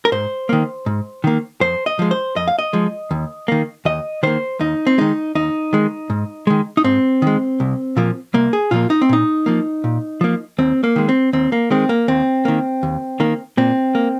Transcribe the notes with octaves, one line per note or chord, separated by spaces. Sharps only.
A#4
G#2 C5
D#3 A#3
G#2
D#3 A#3
F2 C5
D#5
F3 G#3
C5
F2 D#5
F5
D#5
F3 G#3
D#2
D#3 A#3
D#2 D#5
D#3 A#3 C5
D#2 D#4
C4
D#3 G#3 D#4
D#2 D#4
D#3 G#3
G#2
D#3 G#3
D#4
G#2 C4
D#3 G#3
C2
A#2 F3 A#3
C2 A#3
G#4
A#2 F3 A#3 F4
D#4
C4
A#2 D#4
F3 A#3
A#2
F3 A#3
D#2 C4
A#3
D#3 G#3
C4
D#2 C4
A#3
D#3 G#3 C4
A#3
D#2 C4
D#3 A#3
D#2
D#3 A#3
A#2 C4
A#3